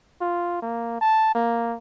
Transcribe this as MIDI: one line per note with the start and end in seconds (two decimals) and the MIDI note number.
0.21 0.60 65
0.62 0.99 58
1.01 1.31 81
1.35 1.77 58